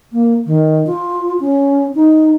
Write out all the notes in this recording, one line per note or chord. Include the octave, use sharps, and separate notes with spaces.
A#3
D#3
F4
C#4
D#4